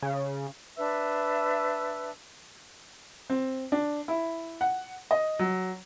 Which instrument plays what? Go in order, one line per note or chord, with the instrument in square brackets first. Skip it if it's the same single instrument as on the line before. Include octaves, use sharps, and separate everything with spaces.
[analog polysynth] C#3
[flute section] D4 B4 E5 E6
[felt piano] C4
D4
E4
F#5
D#5
F#3